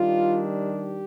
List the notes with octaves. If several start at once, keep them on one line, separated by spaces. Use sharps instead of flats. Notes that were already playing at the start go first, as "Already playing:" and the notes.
Already playing: D#3 G3 D4 F4
G4